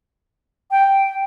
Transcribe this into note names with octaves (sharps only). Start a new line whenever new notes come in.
G5